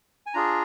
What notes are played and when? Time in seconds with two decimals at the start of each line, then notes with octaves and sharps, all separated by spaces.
0.26 G#5
0.34 D4 F4 G#4 A#5